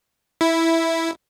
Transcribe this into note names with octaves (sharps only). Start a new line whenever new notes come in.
E4